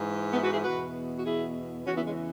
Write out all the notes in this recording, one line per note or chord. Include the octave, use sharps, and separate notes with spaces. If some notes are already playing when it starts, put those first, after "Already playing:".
Already playing: G#2 E3
B3 E4
F#4 B4
E4 G#4
E2 B2 F#4 B4
F#4
E4 G#4
E2 C#3 E3 C#4 F#4
B3 E4
G#3 C#4